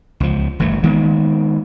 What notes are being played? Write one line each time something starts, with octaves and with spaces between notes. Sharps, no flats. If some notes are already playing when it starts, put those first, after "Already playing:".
C#2 F3
G1 E3 A3
D#3 G#3 A#3 B3